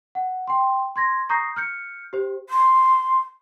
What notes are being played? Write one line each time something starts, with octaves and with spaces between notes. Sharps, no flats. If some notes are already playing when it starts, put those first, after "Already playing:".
F#5
G5 C6
C6 G#6 A#6
A#5 C#6 D#6 G6 A#6 C7
F6 G6 C#7
G4 C5
C6